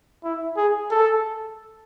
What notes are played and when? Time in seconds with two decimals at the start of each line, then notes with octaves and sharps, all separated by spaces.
0.24 E4
0.57 G#4
0.91 A4